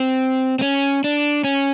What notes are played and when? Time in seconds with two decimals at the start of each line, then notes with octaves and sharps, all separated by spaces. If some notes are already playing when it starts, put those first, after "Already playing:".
Already playing: C4
0.59 C4
0.62 C#4
1.04 D4
1.44 C#4